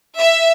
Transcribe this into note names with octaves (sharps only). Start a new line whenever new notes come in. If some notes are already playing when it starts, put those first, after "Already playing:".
E5